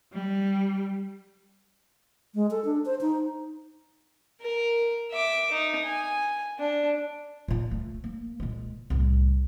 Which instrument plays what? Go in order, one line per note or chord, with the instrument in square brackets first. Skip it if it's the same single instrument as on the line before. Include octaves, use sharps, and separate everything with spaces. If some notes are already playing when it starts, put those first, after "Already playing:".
[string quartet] G3
[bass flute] G#3
A4
D4
C5
D#4
[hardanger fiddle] A#4
E5 D6
D#4
G#5
D4
[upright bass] A#2 F4
A3
A#3
A#2 G#3
C2 A2